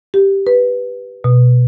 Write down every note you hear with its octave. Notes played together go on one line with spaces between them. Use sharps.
G4
B4
B2